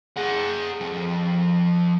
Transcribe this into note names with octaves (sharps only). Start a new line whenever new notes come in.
G#4 F#5
F3 A4